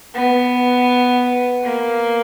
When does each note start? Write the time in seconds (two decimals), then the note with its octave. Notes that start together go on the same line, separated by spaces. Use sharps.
0.15 B3
1.64 A#3